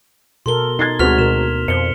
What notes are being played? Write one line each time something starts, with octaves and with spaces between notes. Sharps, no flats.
B2 A4 A#4 C6 G7
D#4 G#6 A6 C7
D2 G#3 C4 F#4 F6 B6 F7
B2 A#4 E7
F2 C5 C#7 G7